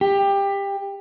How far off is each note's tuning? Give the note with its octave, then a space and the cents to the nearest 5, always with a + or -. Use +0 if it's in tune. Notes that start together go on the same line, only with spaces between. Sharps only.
G4 +20